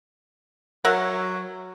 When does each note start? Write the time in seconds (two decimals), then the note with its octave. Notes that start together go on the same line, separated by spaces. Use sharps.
0.85 F#3 A#4 E5 F#5